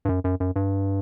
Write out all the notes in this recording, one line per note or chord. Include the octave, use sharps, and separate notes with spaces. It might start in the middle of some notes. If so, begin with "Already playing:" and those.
G2
F#2
F#2
F#2
G2